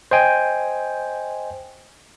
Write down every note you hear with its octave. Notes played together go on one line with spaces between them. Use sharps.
C5 D#5 G5 G#5